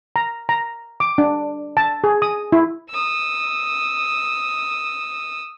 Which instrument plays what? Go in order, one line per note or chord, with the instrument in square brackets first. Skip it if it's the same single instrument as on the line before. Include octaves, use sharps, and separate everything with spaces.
[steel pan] A#5
A#5
D6
D4
A5
G#4
D#6
E4
[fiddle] D#6 E6